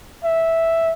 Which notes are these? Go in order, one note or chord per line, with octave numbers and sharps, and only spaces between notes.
E5